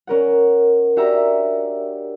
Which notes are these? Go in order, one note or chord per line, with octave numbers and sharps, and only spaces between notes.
C#4 A#4 F#5
D4 F#4 G4 E5 A#5